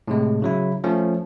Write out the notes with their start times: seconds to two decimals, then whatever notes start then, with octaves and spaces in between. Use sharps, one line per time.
0.08 A2 C3 G#3
0.42 C#3 F#3 E4
0.84 F3 A3 C#4